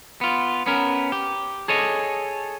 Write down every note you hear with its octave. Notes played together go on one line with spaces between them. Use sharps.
B3 F4
B3 C#4 A#4
G4
G#4 A4 C#5 D#5